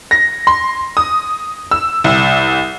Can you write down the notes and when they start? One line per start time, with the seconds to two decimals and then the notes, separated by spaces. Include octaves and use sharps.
0.11 A#6
0.47 C6
0.97 D#6
1.71 E6
2.04 C2